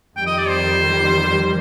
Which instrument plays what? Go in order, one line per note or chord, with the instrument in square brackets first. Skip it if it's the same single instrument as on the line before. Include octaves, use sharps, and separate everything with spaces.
[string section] F2 D#3 G3 [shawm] G5
[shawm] D#5
D5
C5